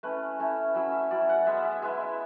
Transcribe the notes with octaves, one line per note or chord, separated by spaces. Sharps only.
A3 C#4 E4 B4
A3 C#4 E4
F#3 C#4 E4 E5
E5
F#3 C#4 E4 D5
F#5
G#3 B3 E4 E5
E5
G#3 B3 E4 E5
E5